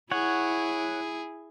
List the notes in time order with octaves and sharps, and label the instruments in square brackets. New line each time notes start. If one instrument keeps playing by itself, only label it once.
[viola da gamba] E4 [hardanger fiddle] G#4 [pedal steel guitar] C#5 F#5